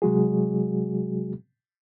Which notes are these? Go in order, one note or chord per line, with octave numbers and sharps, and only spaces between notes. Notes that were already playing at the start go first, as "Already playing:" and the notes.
C3 F#3 G#3 F#4 G#4